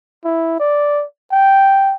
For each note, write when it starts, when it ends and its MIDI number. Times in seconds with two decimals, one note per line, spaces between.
0.24 0.58 64
0.60 1.05 74
1.32 1.95 79